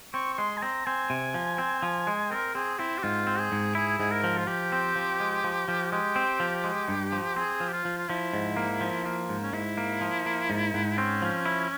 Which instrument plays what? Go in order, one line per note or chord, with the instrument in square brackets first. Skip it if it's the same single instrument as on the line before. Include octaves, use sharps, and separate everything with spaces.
[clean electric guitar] C4 [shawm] C#6
[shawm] C#6
[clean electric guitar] G#3 [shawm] C6
[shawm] G#5
[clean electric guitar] C4 [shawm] A#5
[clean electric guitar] C4 [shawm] G#5
[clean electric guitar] C3
F3
C4
F3
G#3
[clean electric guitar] C4 [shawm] A#4
[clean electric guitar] C4 [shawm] G#4
[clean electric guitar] C4 [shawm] E4
[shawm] G4
[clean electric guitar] G#2 [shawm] F4
[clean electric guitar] C4
[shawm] G#4
[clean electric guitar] G#2
[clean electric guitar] E4 [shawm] G#4
[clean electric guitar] G#2 [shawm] G#4
[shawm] A#4
[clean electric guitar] F3
[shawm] F4
[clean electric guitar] F3 [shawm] G4
[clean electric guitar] C4
F3
G#3
F3
F3
[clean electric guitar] G#3 [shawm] G4
[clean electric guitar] C4
F3
G#3
G2
F3
[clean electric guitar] C4 [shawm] G#4
[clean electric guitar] F3
[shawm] G4
F4
[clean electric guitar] F3
[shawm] F4
[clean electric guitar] F3 [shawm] E4
[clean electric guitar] G#2
A#3
F3
A#3
G#2
[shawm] C#4
[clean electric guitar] G#2 [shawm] E4
[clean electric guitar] A#3
F3
A#3
G#2
G#2
[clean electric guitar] C4 [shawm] C#4
[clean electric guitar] F3
E4